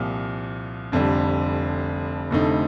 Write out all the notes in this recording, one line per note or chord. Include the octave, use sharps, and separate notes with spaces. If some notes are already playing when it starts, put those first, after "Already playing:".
Already playing: C2 A#2 F3
F1 F2 D3 G3
F1 F2 D3 A3 D#4